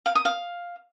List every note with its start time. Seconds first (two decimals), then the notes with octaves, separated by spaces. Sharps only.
0.06 F5
0.15 D#6
0.25 F5